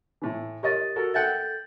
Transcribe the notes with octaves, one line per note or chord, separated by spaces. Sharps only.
A2 E3
G4 A#4 C#5 D#5 A6
F#4 A4 A#4
A4 E5 F#5 G5 G6 A6